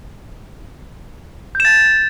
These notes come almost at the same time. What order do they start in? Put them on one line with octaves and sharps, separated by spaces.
G6 E7 A6